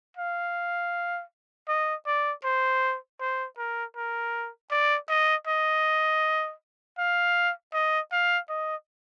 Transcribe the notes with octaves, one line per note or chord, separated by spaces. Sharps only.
F5
D#5
D5
C5
C5
A#4
A#4
D5
D#5
D#5
F5
D#5
F5
D#5